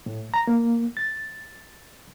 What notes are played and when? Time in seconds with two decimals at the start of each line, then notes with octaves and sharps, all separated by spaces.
0.06 A2
0.34 A#5
0.47 A#3
0.97 A6